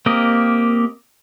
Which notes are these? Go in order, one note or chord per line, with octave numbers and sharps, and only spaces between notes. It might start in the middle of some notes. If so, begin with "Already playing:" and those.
A#3 C4 G4 A#4 D#5